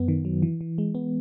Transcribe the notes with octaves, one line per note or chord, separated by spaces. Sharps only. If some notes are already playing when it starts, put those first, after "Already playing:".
Already playing: F#2 B3
D#3
F#3
E3
E3
G#3
B3